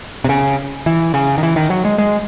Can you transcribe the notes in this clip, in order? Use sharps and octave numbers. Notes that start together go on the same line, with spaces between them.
C3
C#3
E3
C#3
D#3
E3
D#3
F#3
G#3
G#3